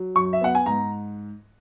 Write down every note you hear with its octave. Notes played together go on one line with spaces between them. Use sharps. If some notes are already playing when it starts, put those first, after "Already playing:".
Already playing: F#3
F#2 C#6
E5
B3 F#5
G#5
G#2 A#5